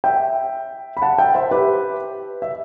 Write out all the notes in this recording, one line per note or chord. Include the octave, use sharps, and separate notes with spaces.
E5 G5
B5
F#5 A5
E5 G5
C5 E5
G4 B4
E5